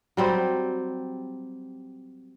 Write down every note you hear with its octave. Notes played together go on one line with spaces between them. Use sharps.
F#3 G3 C4